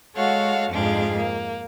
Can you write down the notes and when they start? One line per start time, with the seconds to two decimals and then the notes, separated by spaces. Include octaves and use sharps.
0.16 G#3 F#4 A4 C#5 F5 F#5
0.71 F2 G#2 F3 D4 G#4 F5
1.16 A#3